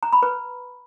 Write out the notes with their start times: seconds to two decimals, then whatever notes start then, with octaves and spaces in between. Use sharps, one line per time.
0.03 A#5
0.13 B5
0.23 B4